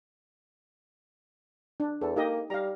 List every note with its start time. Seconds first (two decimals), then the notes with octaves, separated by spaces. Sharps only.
1.80 D4
2.01 E2 A4
2.16 A#3 D#4 G4 D#5
2.50 G3 F5 A#5